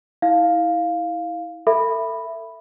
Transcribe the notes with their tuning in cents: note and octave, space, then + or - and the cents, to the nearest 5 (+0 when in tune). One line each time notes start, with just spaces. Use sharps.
E4 -30 F5 +0
A4 +30 E5 +15 B5 +0